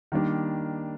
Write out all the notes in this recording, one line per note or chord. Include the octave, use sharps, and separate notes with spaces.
D#3 G3 A#3 D4